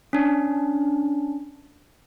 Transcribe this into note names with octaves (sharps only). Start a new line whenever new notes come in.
C#4 D4